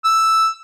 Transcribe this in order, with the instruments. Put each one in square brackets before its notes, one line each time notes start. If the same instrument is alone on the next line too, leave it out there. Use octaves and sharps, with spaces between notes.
[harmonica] E6